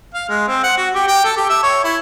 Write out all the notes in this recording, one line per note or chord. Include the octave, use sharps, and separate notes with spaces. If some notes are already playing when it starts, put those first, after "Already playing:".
F5
G#3
C4
F#5
F#4
G4
G5
A4
G4
E5
C#5
E4